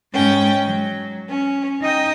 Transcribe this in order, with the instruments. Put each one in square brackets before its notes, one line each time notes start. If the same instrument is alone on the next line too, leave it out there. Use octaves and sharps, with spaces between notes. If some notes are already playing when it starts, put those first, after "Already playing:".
[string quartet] G#2 C#4 G5
F#3
C#4
D#4 D#5 G5 D#6